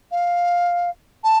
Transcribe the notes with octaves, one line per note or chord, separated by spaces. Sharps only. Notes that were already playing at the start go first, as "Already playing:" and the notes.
F5
A5